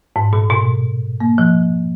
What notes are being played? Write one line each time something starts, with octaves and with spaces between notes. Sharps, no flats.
G#2
A#2
B2
A#3
F3